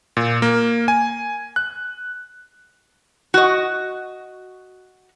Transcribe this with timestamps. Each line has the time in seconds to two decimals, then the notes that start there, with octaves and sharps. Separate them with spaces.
0.17 A#2
0.42 A#3
0.88 G#5
1.56 F#6
3.34 F#4 D#5